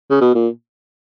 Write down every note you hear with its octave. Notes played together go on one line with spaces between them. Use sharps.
C#3
B2
A#2